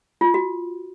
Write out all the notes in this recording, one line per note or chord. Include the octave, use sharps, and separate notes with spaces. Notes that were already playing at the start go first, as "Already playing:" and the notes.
F4
F#4